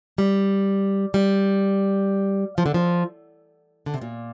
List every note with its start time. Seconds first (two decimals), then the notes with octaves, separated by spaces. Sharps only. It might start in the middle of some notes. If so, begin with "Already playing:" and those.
0.18 G3
1.14 G3
2.58 F3
2.66 D3
2.74 F3
3.86 D3
3.94 C3
4.01 A#2